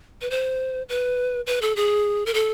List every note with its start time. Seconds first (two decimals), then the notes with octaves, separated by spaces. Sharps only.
0.21 B4
0.30 C5
0.89 B4
1.47 B4
1.62 A4
1.76 G#4
2.26 A#4
2.34 A4